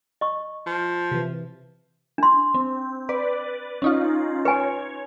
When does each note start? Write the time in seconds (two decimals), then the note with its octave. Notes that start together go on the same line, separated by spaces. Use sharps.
0.21 D#5 C#6
0.66 F3
1.11 C3 E3
2.18 D4 C6
2.54 C4
3.09 B4 D5
3.82 C#4 D#4 F4
4.45 B4 C#5 G#5